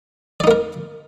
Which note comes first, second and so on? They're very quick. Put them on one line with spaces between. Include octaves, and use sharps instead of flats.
D5 D#4 A#3 A#4